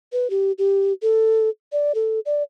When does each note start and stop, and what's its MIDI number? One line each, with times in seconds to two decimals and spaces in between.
0.13 0.30 71
0.30 0.52 67
0.58 0.93 67
1.02 1.49 69
1.72 1.92 74
1.95 2.20 69
2.26 2.43 74